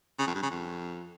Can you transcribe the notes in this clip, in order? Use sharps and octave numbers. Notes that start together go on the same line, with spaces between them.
C#3
F2
G2
C#3
F2